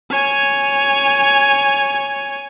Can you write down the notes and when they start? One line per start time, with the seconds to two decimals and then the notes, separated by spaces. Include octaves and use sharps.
0.11 C#5 G#5